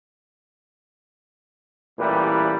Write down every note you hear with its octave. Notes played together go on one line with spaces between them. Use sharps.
A1 A#2 E3 G3 G4 B4